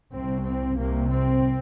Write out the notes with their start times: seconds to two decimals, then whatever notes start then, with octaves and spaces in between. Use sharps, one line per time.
0.13 C2 C3 C4
0.46 C4
0.77 C2 C3 A#3
1.10 C4